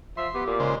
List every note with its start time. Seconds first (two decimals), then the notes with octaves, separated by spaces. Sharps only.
0.17 F3 E5 C6
0.34 B3 G4
0.47 A#2
0.60 C#3 G#3 C5